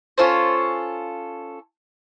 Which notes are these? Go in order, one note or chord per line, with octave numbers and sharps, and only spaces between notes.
C#4 F4 A4 C5